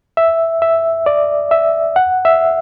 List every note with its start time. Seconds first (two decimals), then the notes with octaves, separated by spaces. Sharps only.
0.17 E5
0.62 E5
1.06 D5
1.51 E5
1.96 F#5
2.25 E5